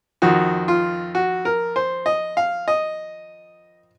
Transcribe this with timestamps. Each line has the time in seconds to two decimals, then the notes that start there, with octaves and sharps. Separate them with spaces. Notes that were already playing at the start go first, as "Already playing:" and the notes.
0.22 F2 D#3 F#4
0.68 F4
1.15 F#4
1.45 A#4
1.76 C5
2.06 D#5
2.37 F5
2.68 D#5